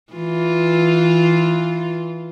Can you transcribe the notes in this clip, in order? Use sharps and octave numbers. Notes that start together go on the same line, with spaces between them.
E3 F4